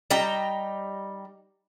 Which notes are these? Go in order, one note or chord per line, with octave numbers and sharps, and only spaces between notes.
G3 D#4 G5 A#5